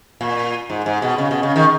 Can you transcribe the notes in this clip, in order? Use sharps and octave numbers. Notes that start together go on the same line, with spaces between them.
A#2
G#2
G#2
B2
C#3
B2
C#3
D#3